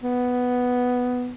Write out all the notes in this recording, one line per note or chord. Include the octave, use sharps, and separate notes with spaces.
B3